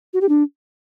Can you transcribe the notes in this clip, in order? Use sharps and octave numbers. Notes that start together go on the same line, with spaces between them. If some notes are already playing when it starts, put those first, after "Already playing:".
F#4
G4
D4